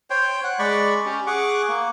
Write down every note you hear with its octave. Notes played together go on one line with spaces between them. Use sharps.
C5 C#5 G5
F#5
G#3 D5 B5 C#6
C#4 G4
G#4 F#5 C#6 D6
A#3